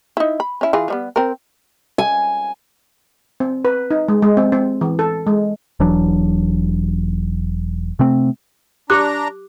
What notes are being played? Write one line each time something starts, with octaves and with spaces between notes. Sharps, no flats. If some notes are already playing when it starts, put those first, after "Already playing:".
D#4 E4
B5
C#4 E4
E3 F4 G#4
F3 G3 B3
C4 A#4
G#5
C4
B4
D#4
G#3
G#3
C4
C4
E3
A4
G#3
E1 E3 F#3 D4
C3 A3 C4
D4 G4 A#5 D6 F#6